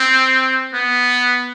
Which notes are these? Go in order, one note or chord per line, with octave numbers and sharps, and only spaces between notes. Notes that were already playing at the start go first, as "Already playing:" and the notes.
Already playing: C4
B3